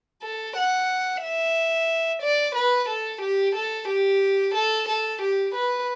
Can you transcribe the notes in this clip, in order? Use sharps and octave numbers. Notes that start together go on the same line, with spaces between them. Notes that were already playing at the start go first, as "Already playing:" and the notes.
A4
F#5
E5
D5
B4
A4
G4
A4
G4
A4
A4
G4
B4